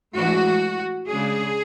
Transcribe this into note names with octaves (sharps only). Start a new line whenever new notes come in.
A2 E3 G#3 D4 F#4
C#3 G#3 D4 G#4